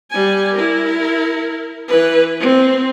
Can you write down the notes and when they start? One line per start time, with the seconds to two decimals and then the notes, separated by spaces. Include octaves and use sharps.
0.10 G3 G#5
0.54 E4 A#4
1.88 E3 B4
2.40 C4